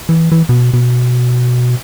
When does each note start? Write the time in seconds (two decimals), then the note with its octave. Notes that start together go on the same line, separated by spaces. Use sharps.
0.09 E3
0.32 E3
0.49 B2
0.73 B2